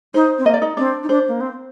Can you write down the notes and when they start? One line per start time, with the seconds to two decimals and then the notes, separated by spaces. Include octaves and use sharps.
0.14 D#4 C5
0.38 C4
0.45 A#3 D#5
0.54 D5
0.62 D#4 D#5
0.77 C4 D4 D5
1.03 D#4
1.09 D4 C5
1.28 A#3
1.41 C4